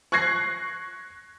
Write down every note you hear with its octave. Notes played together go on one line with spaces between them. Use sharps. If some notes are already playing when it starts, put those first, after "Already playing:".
C#6 F#6 G#6 A#6 C7